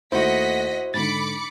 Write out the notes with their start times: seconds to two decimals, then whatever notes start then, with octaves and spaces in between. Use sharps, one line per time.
0.12 D#2 A3 E4 F#4 C5 D#5 F#5 B6
0.94 G#2 D3 B5 D6 A6 C#7